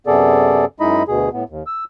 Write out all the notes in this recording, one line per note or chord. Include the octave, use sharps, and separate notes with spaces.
F#2 C3 B3 G#4 A4 D5
F#2 G#3 D#4 E4 D#5 B5
D2 B2 G#4
A2 B3
D#2
E6